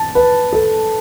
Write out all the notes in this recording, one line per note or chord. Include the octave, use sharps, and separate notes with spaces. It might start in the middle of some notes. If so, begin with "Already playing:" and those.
Already playing: A5
B4
A4